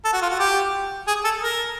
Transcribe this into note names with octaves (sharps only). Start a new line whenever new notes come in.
A4
F#4
F4
F#4
G4
G#4
A4
A#4